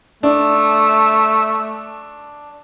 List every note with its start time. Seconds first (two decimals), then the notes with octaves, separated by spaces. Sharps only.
0.23 A3 D4